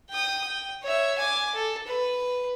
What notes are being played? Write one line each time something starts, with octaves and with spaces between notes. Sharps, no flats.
G5 D#6
G5
C#5 E5
G#5 D6
A4
B4